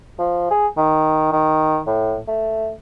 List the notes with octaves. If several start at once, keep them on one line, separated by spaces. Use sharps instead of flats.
F3
G#4
D#3
D#3
A2
A3